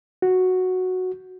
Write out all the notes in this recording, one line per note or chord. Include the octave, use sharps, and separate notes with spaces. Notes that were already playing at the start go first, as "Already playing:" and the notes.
F#4